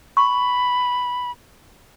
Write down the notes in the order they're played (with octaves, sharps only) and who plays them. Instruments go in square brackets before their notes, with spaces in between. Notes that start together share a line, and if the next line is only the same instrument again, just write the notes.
[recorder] B5 [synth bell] C#6